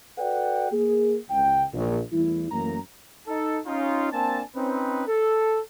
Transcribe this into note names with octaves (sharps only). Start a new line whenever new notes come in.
F#4 A4 B4 D5 F#5 G5
A#3 G#4
C#2 G5
A#1
E2 E3 G3 A3 E4
F#2 E3 A3 A#3 A#5
D#4 A4
C#4 D#4 F4
A#3 C4 D4 G#5 A5
C4 C#4 D#4 B4
A4